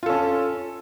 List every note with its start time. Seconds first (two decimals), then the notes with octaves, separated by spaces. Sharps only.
0.03 F4
0.06 A4
0.09 C#4